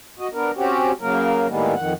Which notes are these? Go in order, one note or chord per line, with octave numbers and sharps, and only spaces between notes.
F#4 D#5
B3 D4 A#4
C4 C#4 F#4 G4
C#3 F#3 A#3 A#4
A2 D#3 G3 G#3 A#3 B3
F2 D#3 F#5